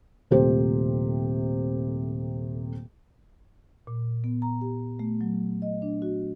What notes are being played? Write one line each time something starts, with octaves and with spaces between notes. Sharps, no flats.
D#1 C3 A3 G4 C5
A#2
B3
A#5
G4
A3
F#3
D#5
D4
F#4